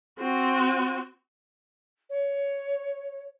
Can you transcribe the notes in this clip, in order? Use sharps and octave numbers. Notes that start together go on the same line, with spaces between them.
C4 F#4
C#5